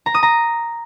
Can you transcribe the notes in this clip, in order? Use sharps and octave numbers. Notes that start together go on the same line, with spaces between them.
A#5
D#6
A#5